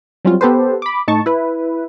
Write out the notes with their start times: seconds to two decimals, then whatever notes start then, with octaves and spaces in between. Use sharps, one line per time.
0.25 F#3 G3 C4 C#4 F4
0.41 B3 G4 A4 B4 C5
0.82 B5 D6
1.08 A2 D#4 A5 C#6
1.26 E4 B4